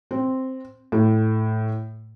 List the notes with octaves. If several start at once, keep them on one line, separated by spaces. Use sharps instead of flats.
C4
A2